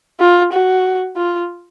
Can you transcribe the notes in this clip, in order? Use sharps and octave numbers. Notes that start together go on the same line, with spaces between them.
F4
F#4
F4